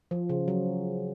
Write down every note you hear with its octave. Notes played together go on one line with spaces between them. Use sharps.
F3
C#3
F#3